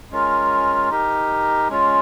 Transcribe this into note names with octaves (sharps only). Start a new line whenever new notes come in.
G#3 C#4 F4 A#4
D#4 G4 A#4
G#3 C#4 F4